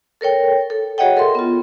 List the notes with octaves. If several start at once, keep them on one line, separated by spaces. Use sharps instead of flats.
A4 A#4 C#5 G5
A4
F#4 G#4 C#5 D#5 F#5 G5
A4 A#4 E5 C6
B3 F4